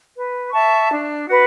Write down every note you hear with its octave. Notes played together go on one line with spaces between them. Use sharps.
B4
E5 A5 C#6
D4
F#4 B4